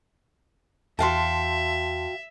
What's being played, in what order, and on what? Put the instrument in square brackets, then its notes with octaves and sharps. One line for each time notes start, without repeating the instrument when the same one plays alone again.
[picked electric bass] E2 [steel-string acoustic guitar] F#4 F5 G5 [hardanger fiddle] E5 [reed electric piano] A5 C6